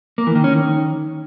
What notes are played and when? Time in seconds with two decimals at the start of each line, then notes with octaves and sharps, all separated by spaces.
0.18 A#3
0.27 E3
0.35 D#3
0.44 C#4
0.53 D#3